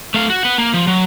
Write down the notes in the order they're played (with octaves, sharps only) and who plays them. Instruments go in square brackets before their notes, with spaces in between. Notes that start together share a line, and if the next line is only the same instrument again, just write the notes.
[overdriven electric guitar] A3 F5
F#4
B4 F#5
A#3
F3
F#3